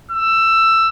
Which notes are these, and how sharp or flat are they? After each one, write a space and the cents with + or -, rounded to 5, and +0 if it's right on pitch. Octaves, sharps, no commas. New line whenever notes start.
E6 +15